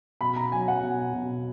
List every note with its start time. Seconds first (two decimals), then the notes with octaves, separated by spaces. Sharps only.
0.21 B2 B5
0.36 A#5
0.52 F#3 G#5
0.68 F#5
0.83 B2
1.13 B2